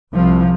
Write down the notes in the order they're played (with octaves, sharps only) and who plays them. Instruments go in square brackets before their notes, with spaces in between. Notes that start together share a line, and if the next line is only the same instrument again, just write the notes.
[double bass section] C2 C3 F3